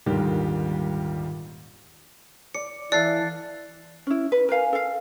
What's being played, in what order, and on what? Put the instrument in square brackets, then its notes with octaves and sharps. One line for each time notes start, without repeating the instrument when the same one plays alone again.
[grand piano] D#1 G#2 D3 G3 G4 A#4
[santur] D5 [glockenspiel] C#7
[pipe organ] E3 [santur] A4 E5 F5 [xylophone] D5 [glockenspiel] F#6 A6 C7
[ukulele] C#4 E4
B4
A#4 B4 F5 G#5
A4 F5